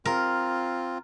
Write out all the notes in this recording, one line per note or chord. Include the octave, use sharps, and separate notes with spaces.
C4 F4 A#4